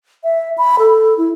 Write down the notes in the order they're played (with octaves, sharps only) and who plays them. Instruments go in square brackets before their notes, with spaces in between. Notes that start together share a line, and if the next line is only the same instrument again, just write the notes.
[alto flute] E5
B5
A4
E4